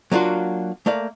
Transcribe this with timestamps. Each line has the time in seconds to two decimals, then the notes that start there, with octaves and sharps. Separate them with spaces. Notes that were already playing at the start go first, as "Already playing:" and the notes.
0.12 F#3 A#3 D4 F4 F#4
0.86 A3 A#3 D5 F5